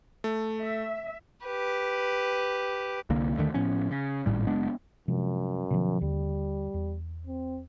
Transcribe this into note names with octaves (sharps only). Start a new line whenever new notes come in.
A3
E5
G4 B4
C2 D3 A#3
D#2 D3 D#3 A3
A2 F3 B3 C#4
C#3
G#1 A2 G3
F#1 G#3 B3 D4
F#2 C3 F3 G#3
B2 D3 F3
D#2 D3 G3
E2
C4